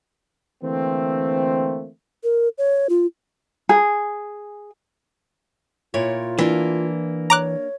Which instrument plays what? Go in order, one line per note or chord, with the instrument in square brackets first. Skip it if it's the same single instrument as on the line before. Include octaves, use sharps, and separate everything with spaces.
[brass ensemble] D3 E3 A3 A#3 C4
[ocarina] A#4
C#5
F4
[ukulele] G#4
[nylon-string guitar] A#2 E4 C#5 [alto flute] F4
[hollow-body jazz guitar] E3 [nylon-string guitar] A#3 D4
[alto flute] C#5 [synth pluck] A#5 D6 F#6